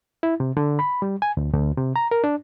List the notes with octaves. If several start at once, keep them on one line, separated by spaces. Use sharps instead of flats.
E4
C3
D3
B5
G3
G#5
D2
D2
C3
A#5
A#4
D4